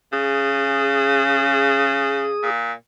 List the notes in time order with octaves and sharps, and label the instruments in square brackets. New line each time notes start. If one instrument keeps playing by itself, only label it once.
[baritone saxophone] C#3 [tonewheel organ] G#4 D#6
[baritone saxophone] A#2